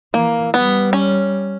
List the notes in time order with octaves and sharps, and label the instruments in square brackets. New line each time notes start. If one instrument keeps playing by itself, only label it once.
[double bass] E3 [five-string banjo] A#3
[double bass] G3 [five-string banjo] B3
[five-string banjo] C#4